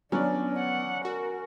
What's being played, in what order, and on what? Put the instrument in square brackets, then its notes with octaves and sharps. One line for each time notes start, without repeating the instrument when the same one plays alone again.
[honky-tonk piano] F#3 D5 [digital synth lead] B3 [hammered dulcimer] C#4 [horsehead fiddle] D4
[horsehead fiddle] F#5
[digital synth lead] F#4 [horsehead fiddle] A#4